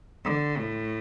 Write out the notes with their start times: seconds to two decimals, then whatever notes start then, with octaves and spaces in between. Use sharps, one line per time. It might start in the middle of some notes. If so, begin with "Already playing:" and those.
0.24 D3
0.58 A2